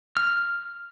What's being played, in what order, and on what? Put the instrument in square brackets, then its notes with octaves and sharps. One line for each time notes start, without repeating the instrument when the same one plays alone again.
[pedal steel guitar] F6